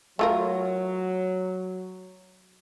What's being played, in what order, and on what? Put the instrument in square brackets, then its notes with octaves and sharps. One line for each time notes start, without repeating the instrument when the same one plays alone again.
[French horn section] F#3 [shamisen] A3 F4 A#4